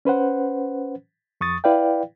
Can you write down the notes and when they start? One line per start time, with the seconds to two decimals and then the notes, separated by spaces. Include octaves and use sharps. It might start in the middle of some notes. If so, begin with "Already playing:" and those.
0.05 C#4 B4 C5 F#5
1.41 F2 C#6 D#6 A6
1.64 E4 B4 D5 F5 G5